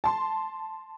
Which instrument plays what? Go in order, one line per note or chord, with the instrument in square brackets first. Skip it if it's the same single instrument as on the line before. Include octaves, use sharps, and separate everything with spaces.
[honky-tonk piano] A5 C6